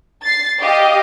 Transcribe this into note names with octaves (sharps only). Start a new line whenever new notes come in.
A6 C7
G4 D#5 F5